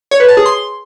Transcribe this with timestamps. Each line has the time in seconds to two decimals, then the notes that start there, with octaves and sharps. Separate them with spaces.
0.11 C#5
0.20 B4
0.29 A5
0.37 G#4
0.46 C6